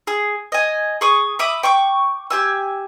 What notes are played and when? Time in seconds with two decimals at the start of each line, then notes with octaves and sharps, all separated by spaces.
0.07 G#4
0.52 D#5 G#5
1.01 G#4 C#6 D#6
1.39 E5 B5 D6 D#6
1.63 G5 C#6 D6
2.30 G4 G#5 E6